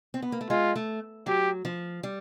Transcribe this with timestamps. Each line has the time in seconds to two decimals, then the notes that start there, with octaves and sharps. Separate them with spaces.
0.14 C4
0.22 B3
0.32 A#3
0.41 A3
0.49 G#3 F4
0.76 A3
1.26 F#3 G4
1.65 F3
2.03 G3